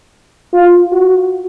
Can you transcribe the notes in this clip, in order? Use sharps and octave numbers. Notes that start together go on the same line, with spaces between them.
F4
F#4